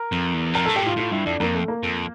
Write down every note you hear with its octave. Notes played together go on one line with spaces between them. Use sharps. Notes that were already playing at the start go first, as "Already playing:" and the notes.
Already playing: A#4
F2
E2
F2 A#4
G2 A4
A#2 G4
A2 F4
A2 F4
G2 E4
F2 D4
F2 A#3
A3
A#3
F2